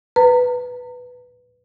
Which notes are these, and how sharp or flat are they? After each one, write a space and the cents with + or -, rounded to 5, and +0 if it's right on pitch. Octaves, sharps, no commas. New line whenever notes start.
B4 +0 A#5 -30